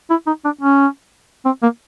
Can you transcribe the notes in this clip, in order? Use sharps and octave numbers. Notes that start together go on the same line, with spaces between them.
E4
D#4
D4
C#4
C4
A#3